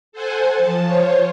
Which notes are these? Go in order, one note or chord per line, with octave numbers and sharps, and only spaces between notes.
A4 C5 F#5 G#5
F3 A5
F4 C5 C#5